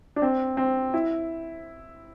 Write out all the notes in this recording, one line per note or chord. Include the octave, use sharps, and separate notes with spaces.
D4
C4
C4
E4